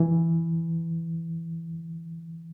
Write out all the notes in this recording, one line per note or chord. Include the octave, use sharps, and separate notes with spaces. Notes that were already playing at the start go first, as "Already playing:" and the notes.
Already playing: E3